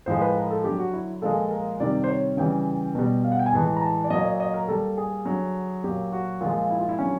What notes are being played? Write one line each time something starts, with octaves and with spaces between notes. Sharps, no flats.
A2 F3 G#3 C5
B4
A#4
A4
D3 F#3 G4
F#4
E4
A#2 F3 G#3 A4
A#4
C3 D#3 G3 D5
C5
C#5
C#3 E3 G3 G5
B2 G3
F5
F#5
G5
G#5
A2 E3 G#3 A5
A#5
A5
D5
A#2 F#3 D#5
D5
D#5
A#4
A#2 G3 A4
G#4
D3 F#3
A#2 F#3 G4
F#4
A#2 F3 G#3 F4
E4
F4
E4
D3 F#3 C#4